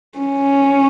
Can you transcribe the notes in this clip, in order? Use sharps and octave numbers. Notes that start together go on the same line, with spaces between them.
C#4